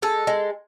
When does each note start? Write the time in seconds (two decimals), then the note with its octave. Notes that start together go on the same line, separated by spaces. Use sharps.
0.02 G#3 A4
0.27 G#3